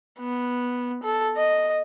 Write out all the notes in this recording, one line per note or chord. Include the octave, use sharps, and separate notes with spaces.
B3
A4
D#5